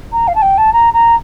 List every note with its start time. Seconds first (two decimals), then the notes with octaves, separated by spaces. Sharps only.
0.12 A#5
0.27 F5
0.35 A5
0.42 G5
0.58 A5
0.73 A#5
0.93 A#5